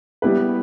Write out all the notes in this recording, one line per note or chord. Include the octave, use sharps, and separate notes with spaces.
G3 B3 E4 G4 B4